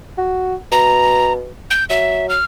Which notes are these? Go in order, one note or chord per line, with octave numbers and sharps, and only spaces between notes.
F#4
B2 A#5
G6
F#3 E5
F6